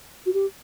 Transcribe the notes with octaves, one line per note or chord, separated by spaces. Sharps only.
F#4
G4